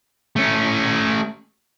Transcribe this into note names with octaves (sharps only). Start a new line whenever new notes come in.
A3 C#4